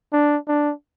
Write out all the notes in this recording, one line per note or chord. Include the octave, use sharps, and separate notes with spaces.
D4
D4